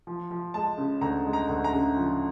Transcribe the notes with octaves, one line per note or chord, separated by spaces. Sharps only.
F3
F3
G#3 A5
C#3
D2 A#5
G#3
A#5
D2
A#5
C#3
F3